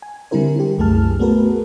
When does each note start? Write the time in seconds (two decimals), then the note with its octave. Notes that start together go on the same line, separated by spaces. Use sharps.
0.02 G#5
0.31 D3 G3 C4 E4 A#4 C5
0.56 E4 G4
0.78 C2 F#2 A3 G#4 A5 F6
1.19 A3 B3 F#4 G#4 A#4 B4